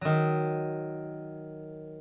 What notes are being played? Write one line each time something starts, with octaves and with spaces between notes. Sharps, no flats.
D#3 F#3